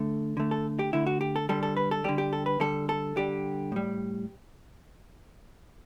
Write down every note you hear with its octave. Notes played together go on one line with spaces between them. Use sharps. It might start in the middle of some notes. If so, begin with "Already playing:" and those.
Already playing: D3 A3 A4
D3 A3
A4
G4
D3 A3 E4
F#4
G4
A4
D3 G3 A4
A4
B4
A4
D3 G3 G4
G4
A4
B4
D3 G3 A4
A4
D3 G3 G4
A2 G3